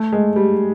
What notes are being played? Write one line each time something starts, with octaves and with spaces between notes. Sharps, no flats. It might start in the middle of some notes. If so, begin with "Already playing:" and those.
Already playing: A3
G#3
G3